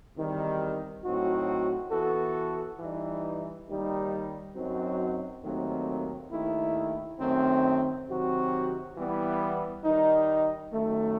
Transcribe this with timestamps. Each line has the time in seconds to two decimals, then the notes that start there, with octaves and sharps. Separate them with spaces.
0.15 E2 C3 D#3 G3
1.04 A2 F#3 C4 D#4 F#4
1.91 E3 B3 F#4 A4
2.79 E3 G3 D#4
3.67 D#2 D#3 G3 D#4
4.55 F#2 F#3 C4 D#4 F#4
5.44 D#2 D#3 F#3 A3 C4
6.31 D#2 D#3 A3 E4
7.19 F#2 D#3 A3 C4
8.08 C3 D#3 F#3 C4 F#4
8.96 E3 G3 B3 E4
9.84 D#3 G3 D#4
10.72 F#2 D#3 A3